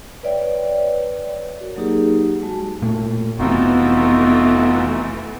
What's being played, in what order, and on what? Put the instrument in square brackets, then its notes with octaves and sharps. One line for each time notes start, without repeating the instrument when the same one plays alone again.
[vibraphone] B4 C#5 D5 E5 G5
F#4 A#4
F#3 A#3 D#4 G4 G#4
G#3 F#4 A5
[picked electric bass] A#2 A3
[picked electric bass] F1 C3 [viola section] E3 A3 [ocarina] B3 [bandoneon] D#4 F4 F#4